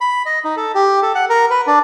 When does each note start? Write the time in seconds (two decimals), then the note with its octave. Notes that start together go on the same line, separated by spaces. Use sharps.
0.01 B5
0.26 D#5
0.45 D#4
0.57 A4
0.75 G4
1.02 A4
1.15 F#5
1.30 A#4
1.50 B4
1.67 D4